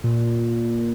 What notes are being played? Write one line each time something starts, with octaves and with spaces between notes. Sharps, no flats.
A#2